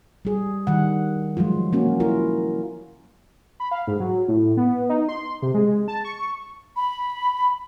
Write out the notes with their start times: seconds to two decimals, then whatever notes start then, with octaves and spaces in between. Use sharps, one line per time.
0.25 G3 G#4
0.67 D#3 G3 F#5
1.37 F3 F#3 G#3 F4
1.73 A#3 C#4 F#4
2.00 E4 F4 A#4
3.60 B5
3.71 F5
3.87 G#2
4.00 F#3
4.28 A2
4.57 B3
4.89 D#4
5.08 C6
5.42 C3
5.54 G#3
5.88 A5
6.05 C#6
6.76 B5